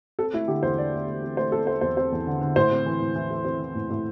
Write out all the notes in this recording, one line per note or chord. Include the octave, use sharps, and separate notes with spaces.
C4 A4
A3 E4
D3 G4
E2 C5
D3 D5
A3
A3
C4
A3 C5
C4 A4
A3 C5
E2 C5
C4 C5
E2
D3
D3
A2 C5
C4
E3
A2
E3
A3
C4
E3
A2
A2